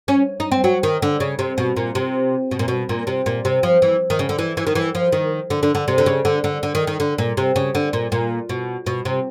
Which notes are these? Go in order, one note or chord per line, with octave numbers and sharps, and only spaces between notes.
C#4
D#4
C4
F#3
D#3
D3
C#3
C3
B2
A#2
C3
B2
A#2
B2
A#2
C3
A#2
C3
F3
E3
D#3
C#3
D3
E3
E3
D#3
E3
F3
D#3
D3
D3
D3
C3
D3
C#3
D3
D3
D3
D#3
D#3
D3
A#2
C3
C#3
D3
A#2
A#2
B2
B2
C3